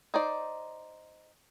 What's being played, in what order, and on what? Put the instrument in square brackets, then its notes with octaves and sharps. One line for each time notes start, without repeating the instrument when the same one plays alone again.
[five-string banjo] D#4 C5 D5